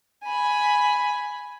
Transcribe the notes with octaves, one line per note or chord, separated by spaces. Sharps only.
G#5 B5